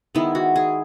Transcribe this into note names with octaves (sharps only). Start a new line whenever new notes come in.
D#3 G#3 B3 E4
F#4
G#4